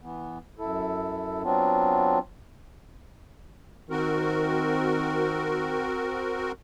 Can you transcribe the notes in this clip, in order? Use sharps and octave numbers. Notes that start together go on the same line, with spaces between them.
E3 B3
F#2 E4 A4
F#3 B3 C4 D4 F4
D#3 C4 F#4 A#4